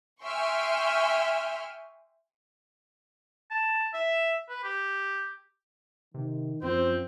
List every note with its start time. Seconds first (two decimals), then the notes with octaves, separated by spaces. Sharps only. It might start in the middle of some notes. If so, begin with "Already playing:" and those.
0.21 E5 G5 G#5 C6 C#6 F6
3.51 A5
3.94 E5
4.50 B4
4.64 G4
6.14 C3 D#3
6.62 F#2 F3 C4 C5